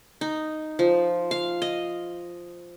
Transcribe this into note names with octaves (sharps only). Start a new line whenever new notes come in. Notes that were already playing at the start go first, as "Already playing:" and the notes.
D#4
F3
F5
D#5